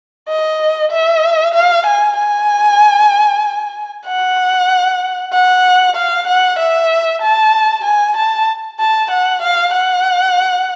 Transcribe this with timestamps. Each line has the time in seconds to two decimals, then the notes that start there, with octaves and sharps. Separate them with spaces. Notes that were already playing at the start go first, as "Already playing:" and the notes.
0.28 D#5
0.92 E5
1.54 F5
1.86 G#5
2.18 G#5
4.07 F#5
5.33 F#5
5.96 F5
6.27 F#5
6.59 E5
7.22 A5
7.84 G#5
8.17 A5
8.79 A5
9.11 F#5
9.42 F5
9.74 F#5